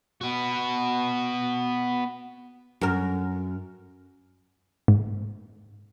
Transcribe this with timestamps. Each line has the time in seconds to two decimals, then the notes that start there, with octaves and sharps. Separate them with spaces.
0.21 B3 F#4
2.81 F#2 A#4
4.88 G#2